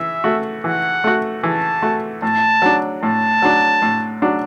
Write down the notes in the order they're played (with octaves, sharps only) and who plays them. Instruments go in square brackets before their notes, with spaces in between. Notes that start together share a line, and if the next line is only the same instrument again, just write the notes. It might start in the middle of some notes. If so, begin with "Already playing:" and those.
Already playing: [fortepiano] E3 [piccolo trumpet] E5
[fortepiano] A3 F#4
[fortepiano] E3 [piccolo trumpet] F#5
[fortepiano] A3 F#4
[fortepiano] E3 [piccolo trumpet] A5
[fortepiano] A3 F#4
[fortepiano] A2 [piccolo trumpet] A5
[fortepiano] F#3 D4
[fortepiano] A2 [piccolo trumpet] A5
[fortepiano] F#3 D4
A2
F#3 D4